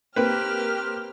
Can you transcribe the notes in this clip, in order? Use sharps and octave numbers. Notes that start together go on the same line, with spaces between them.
A#3 C4 G4 B4 F6